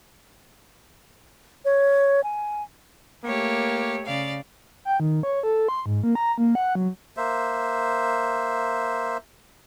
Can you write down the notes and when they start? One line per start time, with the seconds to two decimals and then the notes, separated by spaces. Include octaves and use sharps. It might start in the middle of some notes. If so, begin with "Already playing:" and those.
1.65 C#5
2.24 G#5
3.24 A3 A#3 G4 C#5
4.07 C#3 D5 F5
4.85 G5
5.00 D#3
5.23 C#5
5.43 A4
5.68 C6
5.86 G#2
6.04 A#3
6.15 A#5
6.38 A#3
6.55 F#5
6.75 F#3
7.17 A#3 C5 E5